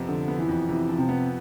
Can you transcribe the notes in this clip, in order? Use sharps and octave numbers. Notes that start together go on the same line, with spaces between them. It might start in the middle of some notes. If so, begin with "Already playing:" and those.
Already playing: F2 C3 B3
D3 F3
B3
E3
F2
C3 E3
F3
C3
B3